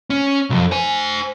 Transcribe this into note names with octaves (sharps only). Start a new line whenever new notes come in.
C#4
B1 F2
C5 G#5